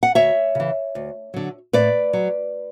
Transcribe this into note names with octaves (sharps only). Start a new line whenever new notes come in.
F#5
D2 C#5 E5
C#3 E3
D2
D3 F#3
A2 B4 D5
F#3